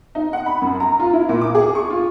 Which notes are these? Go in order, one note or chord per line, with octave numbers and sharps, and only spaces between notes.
D#4
F#5
B5
F#2
A#5
F4
E4
A#2
D6
G#4
C#6
F4